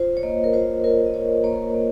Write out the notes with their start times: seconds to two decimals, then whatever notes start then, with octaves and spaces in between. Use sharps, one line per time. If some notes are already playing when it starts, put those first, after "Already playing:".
Already playing: F4 C5
0.17 C#5
0.23 A#3 D#5
0.44 A#4
0.53 F4 C5
0.84 F4 A#4
1.06 D#5
1.14 F4 C#5
1.44 A#3 C#5
1.74 A#3